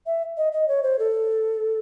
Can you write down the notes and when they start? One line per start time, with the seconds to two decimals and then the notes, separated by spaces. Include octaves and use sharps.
0.06 E5
0.37 D#5
0.52 D#5
0.68 C#5
0.83 C5
0.99 A4